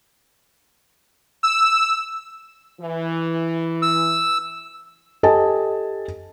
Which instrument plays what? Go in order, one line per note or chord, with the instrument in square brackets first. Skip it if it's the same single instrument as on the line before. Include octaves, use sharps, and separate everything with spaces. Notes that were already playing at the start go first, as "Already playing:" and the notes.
[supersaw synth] E6
[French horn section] E3
[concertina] E6
[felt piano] G4 A4 D#5 G#5 A5